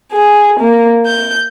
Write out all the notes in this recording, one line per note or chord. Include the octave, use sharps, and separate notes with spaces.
G#4
A#3
G6